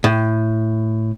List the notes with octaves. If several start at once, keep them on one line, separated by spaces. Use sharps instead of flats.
A2